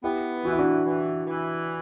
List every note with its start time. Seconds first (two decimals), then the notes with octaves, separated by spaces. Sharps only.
0.04 B3 E4 G4
0.44 E3 F#4
0.52 E4
0.59 D4 F#4
0.85 E3
1.27 E3